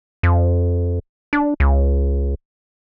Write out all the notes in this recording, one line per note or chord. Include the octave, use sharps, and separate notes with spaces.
F2
D4
C#2